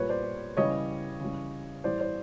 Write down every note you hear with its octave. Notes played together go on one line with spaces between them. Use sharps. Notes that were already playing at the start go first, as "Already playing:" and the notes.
Already playing: A#2 G3 B4 C#5
C5 D5
C#3 E3 G3 C#5 D#5
C#3 E3 G3
A2 E3 G3 C5 D5
C5 D5